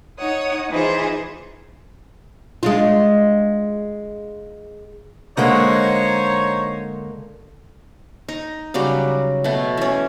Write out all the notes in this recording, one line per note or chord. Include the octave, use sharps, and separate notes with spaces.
D#4 C#5 F#5 D#6
E3 D#4 F4 G#4 C5
G#3 D4 F4
D3 G#3 A#3 D#4 C5 C#5
D#4
C#3 F#3 G3 F#4
B2 A3
E3 C#4